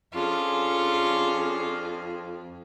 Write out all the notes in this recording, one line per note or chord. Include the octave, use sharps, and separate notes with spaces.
F2 C#4 D4 F4 G#4